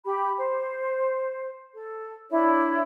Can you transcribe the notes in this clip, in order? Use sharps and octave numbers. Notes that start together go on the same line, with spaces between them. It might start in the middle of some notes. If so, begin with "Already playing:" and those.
G4 B5
C5
A4
D4 E4 C#5